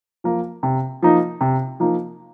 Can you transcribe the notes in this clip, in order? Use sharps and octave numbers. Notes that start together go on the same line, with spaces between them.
F3 A#3
C3
F3 A#3 D#4
C3
F3 A#3 D#4